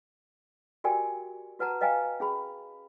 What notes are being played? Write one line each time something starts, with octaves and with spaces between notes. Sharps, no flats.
F#4 G4 A#4 D5 G5 G#5
F#4 B4 F#5 A5 A#5
B4 D#5 F5 G5 G#5 A#5
C#4 G#4 B5